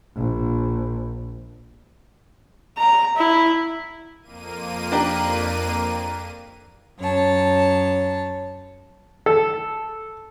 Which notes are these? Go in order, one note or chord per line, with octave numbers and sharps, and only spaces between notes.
A#1
A#5
E4
F2 A#3 D#7
D4 G4 A#4
F#2 C#5 A5
A4